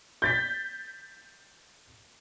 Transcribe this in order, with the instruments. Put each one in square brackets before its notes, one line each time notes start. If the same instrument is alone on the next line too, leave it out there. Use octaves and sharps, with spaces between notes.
[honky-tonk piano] G6 A6 B6